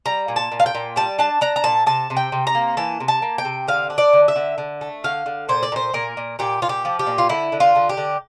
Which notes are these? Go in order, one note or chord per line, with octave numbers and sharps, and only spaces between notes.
G3 A#5
A#2
A5
A#2
F5
G5
A#2
G3 A5
D4 A5
D4 A#5
A#5
A#2 A5
C3 A5
C3
G5
C3
A#5
A#3
E3 A5
C3
A5
A#3
G5
C3
D3 F5
D4
D5
D3
E5
D3
D3
A3
D3 F5
D3
A#2 C5
D5
A#2 C5
A#2 A#4
A#2
A#2 G4
A#2 F4
G4
F3
G4
A#2
F4
D3 E4
D3
F4
D3
G4
D3